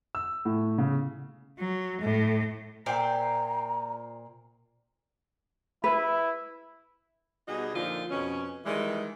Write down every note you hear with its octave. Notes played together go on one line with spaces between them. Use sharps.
E6
A2
C#3
F#3
A2
A#2 C5 D5 E5 G5 A#5 E6
E4 B4
B2 G3 D#4 F#4 G#4
A#2 D3 F3 D#4 F4
F2 B2 C#4
D#3 E3 G3 G#3